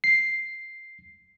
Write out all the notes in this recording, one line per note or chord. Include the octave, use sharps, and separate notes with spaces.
C7